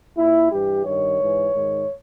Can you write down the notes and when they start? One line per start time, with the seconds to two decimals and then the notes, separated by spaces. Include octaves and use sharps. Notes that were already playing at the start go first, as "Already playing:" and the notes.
0.17 A#2 E4
0.51 G2 E3 G4
0.85 G2 D#3 C#5
1.19 G#2 E3
1.53 G#2 D#3